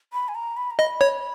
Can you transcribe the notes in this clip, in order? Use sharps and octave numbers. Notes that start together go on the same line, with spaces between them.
B5
G#5
A#5
B5
A#5
D#5 B5
C#5